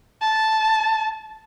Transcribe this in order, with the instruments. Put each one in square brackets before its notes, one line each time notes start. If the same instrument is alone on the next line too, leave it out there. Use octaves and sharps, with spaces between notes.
[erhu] A5